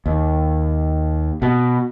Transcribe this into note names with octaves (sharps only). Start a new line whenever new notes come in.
D#2
B2